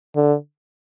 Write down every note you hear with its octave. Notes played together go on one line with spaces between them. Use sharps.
D3